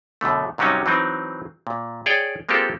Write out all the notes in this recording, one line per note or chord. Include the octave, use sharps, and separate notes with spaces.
F#2 B2 D3 A3
G#2 C3 F#3 G3 C#4 D#4
E3 F#3 C4 D#4
A#2
G#4 C#5 D5 G5
G#3 A#3 C4 F4 G4 A4